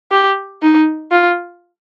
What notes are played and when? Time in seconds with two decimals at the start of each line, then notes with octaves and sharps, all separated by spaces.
0.11 G4
0.62 D#4
1.11 F4